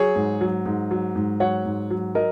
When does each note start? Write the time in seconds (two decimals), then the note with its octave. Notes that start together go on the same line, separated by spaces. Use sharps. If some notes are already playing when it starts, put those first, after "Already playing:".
Already playing: F#3 G#4 C#5
0.16 G#2
0.41 F#3
0.66 G#2
0.91 F#3
1.15 G#2
1.40 F#3 C#5 F#5
1.65 G#2
1.90 F#3
2.15 F#3 A#4 D#5